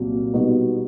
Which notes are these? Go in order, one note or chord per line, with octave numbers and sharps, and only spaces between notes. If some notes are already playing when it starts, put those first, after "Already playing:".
Already playing: C2 A#2 F#3 A#3
B2 G3 B3 D#4 F#4